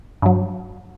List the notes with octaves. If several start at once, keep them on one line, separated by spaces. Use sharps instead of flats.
G2 F#3